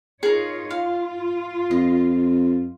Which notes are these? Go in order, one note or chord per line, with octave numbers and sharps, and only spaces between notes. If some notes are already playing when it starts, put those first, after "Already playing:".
D#4 F4 G#4 A#4 C#5
F4 F5
F2 D#5